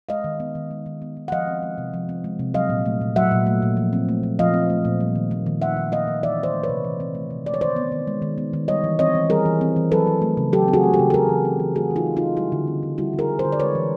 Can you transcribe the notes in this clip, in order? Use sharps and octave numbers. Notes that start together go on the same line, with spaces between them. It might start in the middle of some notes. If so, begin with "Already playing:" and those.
G#3 D#5 F5
D#3
B3
D#3
G#3
D#3
B3
D#3
F#5
F3 D#5 F5
C4
G#3
C3
F3
C4
G#3
C3
F#3 D#5 F5
A#2
A3
A#2
F#3 E5 F#5
A#2
A3
A#2
F3
C4
A3
A#2
F3 D#5 F5
C4
A3
A#2
G3
D#3
A#3
D#3
G3 E5 F#5
D#3
A#3 D#5 F5
D#3
E3 D5 E5
C4
C5 D5
A3
B4 C#5
C3
E3
C4
A3
C3
G#3 D5
C#5
D#3 C5 D5
B3
D#3
G#3
D#3
B3
D#3
G3 C#5 D#5
E3
C4 C#5 D#5
E3
G3 G#4 A#4
E3
C4
E3
F#3 A4 B4
C4
A3
C#3
F#3 G4 A4
C4
F#4 G#4
A3
G4 A4
C#3
A4
A3 G#4 A#4
E3
C4
E3
A3 F#4 G#4
E3
D#4 F4
C4
D#4 F4
E3
G3 E4 F#4
D3
C4
D3
G3 E4 F#4
D3
G#4 A#4
C4
A#4 C5
D3
D5
G#3 B4 C#5
E3